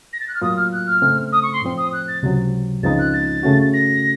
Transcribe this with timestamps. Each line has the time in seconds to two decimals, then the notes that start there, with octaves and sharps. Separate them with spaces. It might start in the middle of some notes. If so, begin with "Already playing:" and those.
0.13 A#6
0.20 A6
0.28 F#6
0.34 F6
0.42 A2 F#3 A#3 F4 D#6
0.56 F6
0.72 F#6
0.87 F6
1.02 C#3 A3 C4
1.32 D#6
1.42 C#6
1.53 C6
1.62 A2 F3 C4
1.77 D#6
1.92 F#6
2.08 A6
2.23 C#2 C3 F#3
2.83 C#2 C#3 F3 C4 D#4 A6
2.98 F#6
3.13 A6
3.43 C#3 A3 C#4 F#4
3.73 A#6